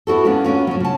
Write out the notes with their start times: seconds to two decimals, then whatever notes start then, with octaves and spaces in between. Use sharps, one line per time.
0.07 B3 E4 F#4 A4
0.25 A#3 B3 C#4 D4
0.44 A#3 B3 C#4 F4
0.67 F#3 C#4
0.80 C#3 A5